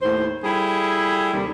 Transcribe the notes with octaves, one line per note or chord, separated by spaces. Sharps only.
D#2 A2 C5
G3 E4 G#4 A4
D#2 C3 G3